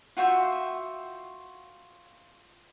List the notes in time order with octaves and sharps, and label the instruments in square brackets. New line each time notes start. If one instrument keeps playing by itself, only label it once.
[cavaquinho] F4 F#4 E5 G5